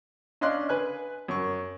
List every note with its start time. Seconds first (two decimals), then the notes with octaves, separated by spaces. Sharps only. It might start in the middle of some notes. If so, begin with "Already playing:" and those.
0.41 C#4 D4 D#5 F5 C6 F#6
0.69 B4 G#5 F#6
1.28 F#2 C#6